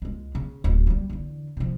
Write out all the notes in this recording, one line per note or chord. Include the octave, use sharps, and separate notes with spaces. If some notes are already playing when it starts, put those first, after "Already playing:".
C#2 G#3
C#3
D1
F#3 G3
E2 D3
C3 F3